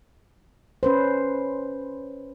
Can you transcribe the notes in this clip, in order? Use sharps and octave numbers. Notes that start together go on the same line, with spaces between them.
C#4 B4 C5